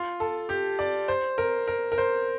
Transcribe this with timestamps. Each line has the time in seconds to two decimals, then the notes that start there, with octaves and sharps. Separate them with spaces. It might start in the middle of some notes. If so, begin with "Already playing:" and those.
Already playing: F4
0.20 A4
0.49 G4
0.79 D5
1.08 C5
1.38 A#4
1.67 A#4
1.92 A#4
1.98 C5